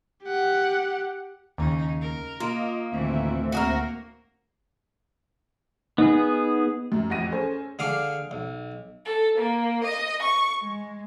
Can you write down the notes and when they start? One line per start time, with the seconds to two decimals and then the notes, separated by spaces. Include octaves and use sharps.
0.24 G4 F#5
1.58 D#2 C#3 D#4
2.01 A#4
2.40 A#3 F4 D#5
2.92 D2 A2 D#3 E3 C4 E5
3.52 A#3 F#4 G#4 A#4
5.98 B3 D#4 G#4
6.92 F#2
7.10 A1 F2 F#5 A#6 D#7
7.32 C#4 G#4 A4 C5
7.79 D3 G#4 F5 D6
8.31 B1
9.05 A4
9.38 A#3
9.84 D#5
10.22 C#6
10.63 G#3